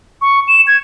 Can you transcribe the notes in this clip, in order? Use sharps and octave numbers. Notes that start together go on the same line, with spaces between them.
C#6
E7
G#6